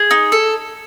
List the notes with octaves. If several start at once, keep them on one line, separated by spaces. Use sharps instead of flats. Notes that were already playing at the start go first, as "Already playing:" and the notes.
Already playing: G#4
D#4
A4